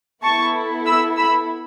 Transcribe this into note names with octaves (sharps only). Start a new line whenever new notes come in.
B3 E4 A4 A5 C#6
B5 E6
B5 E6